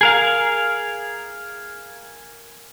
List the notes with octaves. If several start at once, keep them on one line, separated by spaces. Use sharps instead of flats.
G#4 A#4 F5